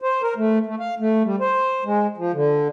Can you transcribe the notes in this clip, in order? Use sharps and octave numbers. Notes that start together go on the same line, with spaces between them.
C5
A#4
A3
A3
F5
A3
G3
C5
G#3
F3
D3